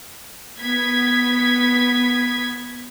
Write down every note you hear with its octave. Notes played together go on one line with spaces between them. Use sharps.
B3 G#6 B6